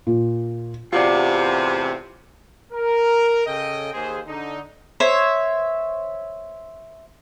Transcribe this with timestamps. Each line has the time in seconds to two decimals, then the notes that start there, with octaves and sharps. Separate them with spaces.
0.07 A#2
0.93 E2 A2 C3 F4 F#4 D5
2.73 A#4
3.47 C#3 A4 D#5 G5
3.94 D#2 G#4 C5
4.27 D3 D#4
5.00 C5 C#5 E5